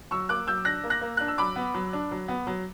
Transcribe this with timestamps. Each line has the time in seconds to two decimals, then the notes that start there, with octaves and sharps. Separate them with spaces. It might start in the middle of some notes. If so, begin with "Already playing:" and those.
0.11 F#3 C#6 E6
0.29 A#3 D6 F#6
0.47 F#3 E6 G6
0.65 D4 F#6 A#6
0.84 A#3
0.90 F#6 A#6
1.01 A#3
1.17 D4 F#6
1.28 E6
1.38 F#3 B5 D6
1.56 B3
1.74 F#3
1.93 D4
2.11 F#3
2.28 B3
2.47 F#3